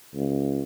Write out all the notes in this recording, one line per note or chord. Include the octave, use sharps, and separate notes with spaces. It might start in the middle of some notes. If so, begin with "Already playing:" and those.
C#2